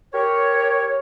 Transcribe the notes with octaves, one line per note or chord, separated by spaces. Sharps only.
G4 A#4 C#5